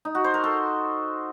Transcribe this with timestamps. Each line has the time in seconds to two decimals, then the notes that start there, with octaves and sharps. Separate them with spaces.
0.05 D#4
0.15 F#4
0.24 C5
0.34 A#4
0.44 A4